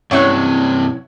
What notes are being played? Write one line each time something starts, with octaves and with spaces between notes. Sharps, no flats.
G2 C3 F#3 C#4 E4 C#5 C#6 F#6